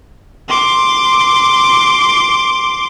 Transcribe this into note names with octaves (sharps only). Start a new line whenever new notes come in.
C6 D6